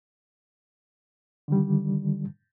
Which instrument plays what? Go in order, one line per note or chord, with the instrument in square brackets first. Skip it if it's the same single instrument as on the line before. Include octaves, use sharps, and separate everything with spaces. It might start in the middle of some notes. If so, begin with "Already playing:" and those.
[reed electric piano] D3 D#3 G3